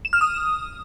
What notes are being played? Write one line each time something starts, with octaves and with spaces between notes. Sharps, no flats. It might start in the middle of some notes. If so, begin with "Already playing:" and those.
E7
F6
D#6